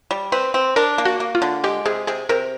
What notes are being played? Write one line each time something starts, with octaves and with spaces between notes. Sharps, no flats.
G3
C4 B4
C4
D4 A#4
A#3
F#4
A#3
F4
D3
G#3 G4
C3 G#4
C3 G#4
C3 A#4